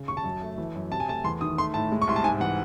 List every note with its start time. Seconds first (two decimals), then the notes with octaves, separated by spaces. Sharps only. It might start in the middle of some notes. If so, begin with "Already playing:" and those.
Already playing: C#3
0.08 D#2 C#6
0.17 A5
0.24 F#2
0.42 A3
0.58 E3
0.75 F#2
0.91 C3 A5
1.00 G#5
1.08 A3 A5
1.24 E2 C6
1.41 D#3 D#6
1.58 A3 C6
1.74 A2 A5
1.92 G#3
2.02 C#6
2.07 C2 C6
2.16 A5
2.24 G#2 G#5
2.40 E3 F#5